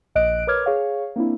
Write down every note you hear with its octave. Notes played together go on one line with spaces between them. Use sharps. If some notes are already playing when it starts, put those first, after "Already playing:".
A#1 D#5 F#6 D7
A#4 B4 C#5 D6 F6 G#6
G#4 C#5 F5
A#3 C4 D4 E4